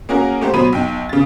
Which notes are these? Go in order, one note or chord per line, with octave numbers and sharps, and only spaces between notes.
A#3 C#4 F#4 G#4 A#4
A3 G4 C5 F#5
B2 F#3 C5 B5 D#7
B1 G5
C#3 A6